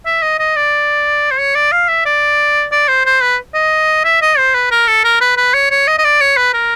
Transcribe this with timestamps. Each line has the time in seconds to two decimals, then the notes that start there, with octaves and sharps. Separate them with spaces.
0.06 E5
0.22 D#5
0.39 D#5
0.56 D5
1.31 C5
1.39 C#5
1.55 D5
1.72 F5
1.88 E5
2.05 D5
2.71 D5
2.88 C5
3.05 C5
3.22 B4
3.54 D#5
4.04 E5
4.22 D#5
4.37 C5
4.55 B4
4.71 A#4
4.88 A4
5.04 A#4
5.21 B4
5.37 B4
5.54 C#5
5.71 C#5
5.87 D#5
5.99 D#5
6.04 D5
6.21 C#5
6.37 B4
6.54 A#4